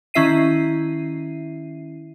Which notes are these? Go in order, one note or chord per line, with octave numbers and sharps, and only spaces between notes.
D#3 C#4 E4 E5 C7 D#7